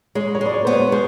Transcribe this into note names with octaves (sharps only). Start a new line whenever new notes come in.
G#3 C#5
C#5
G#3 D5
C#5
B3 C5
C#5
G#3 C5